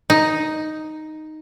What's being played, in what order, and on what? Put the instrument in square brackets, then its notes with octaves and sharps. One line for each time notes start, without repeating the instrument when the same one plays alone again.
[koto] D#4